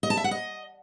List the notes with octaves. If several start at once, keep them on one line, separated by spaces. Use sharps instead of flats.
D#5
A5
E5
F#5
D#5